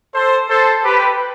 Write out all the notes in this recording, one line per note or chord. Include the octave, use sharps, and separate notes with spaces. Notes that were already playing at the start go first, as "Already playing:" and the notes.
A4 C5
A4 C5
G4 B4